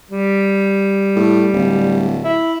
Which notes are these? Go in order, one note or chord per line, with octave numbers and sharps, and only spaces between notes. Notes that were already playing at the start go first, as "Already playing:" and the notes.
G3
A2
D1
E4